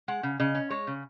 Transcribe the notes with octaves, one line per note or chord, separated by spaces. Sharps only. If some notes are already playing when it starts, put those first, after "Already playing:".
G#3 F#5
C#3
C#3 D#5
C#4
G#3 C#5
C#3